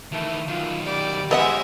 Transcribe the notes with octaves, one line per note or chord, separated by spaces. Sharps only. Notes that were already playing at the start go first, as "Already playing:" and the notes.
D#3 E3 A3
F#2 D#3 F4
G3 D5
F3 G#3 B3 C#4 D#5 E5 F#5